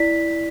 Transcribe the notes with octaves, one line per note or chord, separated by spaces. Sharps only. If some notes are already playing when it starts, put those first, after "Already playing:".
Already playing: E4 D5 B6